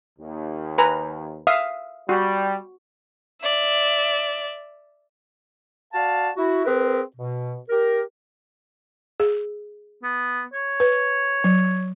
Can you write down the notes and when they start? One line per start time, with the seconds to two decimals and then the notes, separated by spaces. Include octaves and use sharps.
0.19 D#2
0.78 B4 G#5 A#5
1.47 E5 F5 D#6
2.09 G3 F#4
3.41 D5 E5
5.94 F#4 D5 F5 A5
6.37 E4 F#4
6.65 C4 G#4 A#4 B4
7.16 B2
7.69 G4 A#4
9.20 G#4
10.03 B3
10.54 C#5
10.80 B4
11.44 F#3